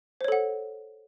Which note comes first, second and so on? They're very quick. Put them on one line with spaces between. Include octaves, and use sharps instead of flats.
C5 C#5 A4 F#5